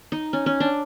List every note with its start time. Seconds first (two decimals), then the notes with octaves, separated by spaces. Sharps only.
0.12 D#4
0.33 C#4
0.46 C#4
0.60 D4